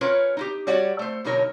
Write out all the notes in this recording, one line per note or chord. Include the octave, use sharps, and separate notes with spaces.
C#4 F4 A#4 B4 C#5
D#4 E4 G4
G3 F#4 C#5 D5 F#5
A3 C5
B2 D3 F#3 D#4 A#4 C#5